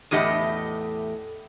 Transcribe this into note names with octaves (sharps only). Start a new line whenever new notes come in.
E2 A2 G4 D#5 F#5